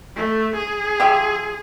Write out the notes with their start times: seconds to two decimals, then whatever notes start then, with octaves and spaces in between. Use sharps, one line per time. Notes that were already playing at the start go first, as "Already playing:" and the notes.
0.16 A3
0.55 G#4
1.00 F3 G4 E5